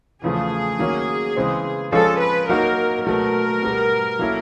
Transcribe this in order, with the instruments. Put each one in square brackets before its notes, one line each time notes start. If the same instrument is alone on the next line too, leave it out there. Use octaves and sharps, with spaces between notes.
[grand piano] E2 C#3 F3 A3 [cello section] G#4
[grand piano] D#3 F#3 A#3 C#4
C#3 E3 G#3 C4
[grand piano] F3 G#3 C#4 F4 G#4 [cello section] A4
[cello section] B4
[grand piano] F#3 A#3 D#4 F#4 [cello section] A#4
[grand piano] B2 F#3 A3 [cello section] A#4
[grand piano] B2 G3 B3
F#3 A#3 C#4 E4 A4